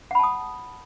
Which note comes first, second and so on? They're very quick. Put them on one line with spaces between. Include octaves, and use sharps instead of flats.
F#5 B5 A5 D#6